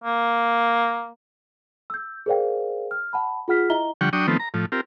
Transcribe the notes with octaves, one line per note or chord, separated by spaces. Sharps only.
A#3
E6 G6
G#4 A#4 C5 D5 F5 G5
F6
F#5 A5 B5
F4 G#4 F#5 F6 B6
E4 D#5 E5 A#5 G7
D3 F3 G3 F#5 G5 C#6
F#3 D4 G5 C#6 D#6
D#3 F3 A3 B3 C4
A#5
A2 F3
C4 F4 G4 A#4